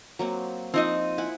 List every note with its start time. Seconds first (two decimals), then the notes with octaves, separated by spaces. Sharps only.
0.19 F#3 A#3 C4
0.74 F3 C4 D#4 D#5
1.18 E4 F#5 G#5